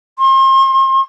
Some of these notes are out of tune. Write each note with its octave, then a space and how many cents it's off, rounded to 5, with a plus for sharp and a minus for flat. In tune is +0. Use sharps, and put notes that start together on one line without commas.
C6 +35